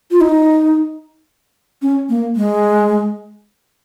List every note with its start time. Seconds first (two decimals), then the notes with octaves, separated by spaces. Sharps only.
0.11 F4
0.21 D#4
1.82 C#4
2.09 A#3
2.36 G#3